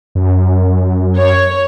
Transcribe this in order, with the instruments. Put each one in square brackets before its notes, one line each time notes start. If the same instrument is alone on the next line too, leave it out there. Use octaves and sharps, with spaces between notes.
[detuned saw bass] F#2
[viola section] C#5